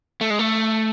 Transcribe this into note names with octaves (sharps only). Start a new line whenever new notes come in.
A3
G#3
A3